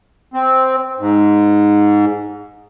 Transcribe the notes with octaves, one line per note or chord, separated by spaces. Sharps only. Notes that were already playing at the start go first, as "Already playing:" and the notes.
C4
G#2